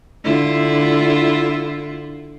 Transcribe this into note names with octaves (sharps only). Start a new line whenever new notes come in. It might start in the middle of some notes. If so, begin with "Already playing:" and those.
D3 E4 F4